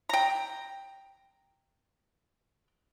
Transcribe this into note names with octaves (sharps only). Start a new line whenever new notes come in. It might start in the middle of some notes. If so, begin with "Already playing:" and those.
G5 A#5